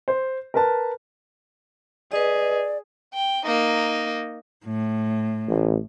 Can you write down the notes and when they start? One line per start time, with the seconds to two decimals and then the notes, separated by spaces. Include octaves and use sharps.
0.08 C5
0.54 A#4 B4 A5
2.12 G#4 B4 D5 D#5
3.14 G5
3.46 A#3 D#4
4.66 A2
5.48 A1